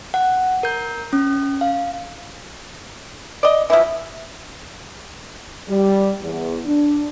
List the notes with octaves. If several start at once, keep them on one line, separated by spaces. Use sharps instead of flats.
F#5
A#4 G6
C#4
F5
D5 D#5
E3 F3 E5
G3
E2
D4